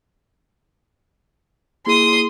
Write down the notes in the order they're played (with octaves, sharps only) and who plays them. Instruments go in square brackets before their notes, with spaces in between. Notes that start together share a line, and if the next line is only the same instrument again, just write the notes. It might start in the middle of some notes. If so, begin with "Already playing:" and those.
[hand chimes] A#3 E4 G#4 [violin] C6 D#6